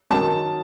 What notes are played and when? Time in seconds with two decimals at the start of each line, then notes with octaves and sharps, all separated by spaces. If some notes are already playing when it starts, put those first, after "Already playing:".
0.10 D#3 F#3 A5